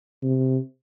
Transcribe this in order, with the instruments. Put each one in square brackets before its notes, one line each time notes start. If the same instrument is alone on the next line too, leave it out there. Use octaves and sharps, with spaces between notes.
[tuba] C3